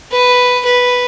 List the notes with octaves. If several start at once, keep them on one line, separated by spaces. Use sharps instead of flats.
B4
B4